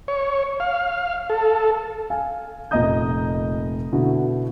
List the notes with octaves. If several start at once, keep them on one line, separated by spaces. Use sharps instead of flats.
C#5
F5
A4
F5 G#5
F1 A#2 D#5 A#5 D#6 G6
B2 D3 E4 F#4